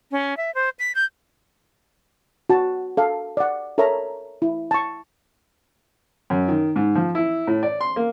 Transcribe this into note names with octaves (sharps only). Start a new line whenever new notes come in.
C#4
E5
C5
B6
G6
F#4 A5
A4 F5
D5 F#5
A4 A#4 C#5 E5 A#5
E4
A5 C#6
F#2
D#3
G#2
F3
E4
A2
D5
C6
A#3